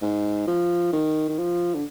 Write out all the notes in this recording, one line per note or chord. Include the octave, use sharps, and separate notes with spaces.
G#2
F3
D#3
D#3
F3
D3